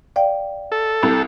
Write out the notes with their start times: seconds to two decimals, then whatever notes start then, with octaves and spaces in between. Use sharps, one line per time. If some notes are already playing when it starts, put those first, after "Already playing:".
0.16 D5 F5 G5
0.72 A4
1.03 C2